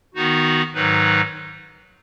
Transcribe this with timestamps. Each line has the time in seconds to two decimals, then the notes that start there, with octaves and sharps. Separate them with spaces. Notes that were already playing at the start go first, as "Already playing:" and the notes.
0.15 D#3 B3 D#4 F#4
0.74 G#2 D#3 F#3 D#4 B4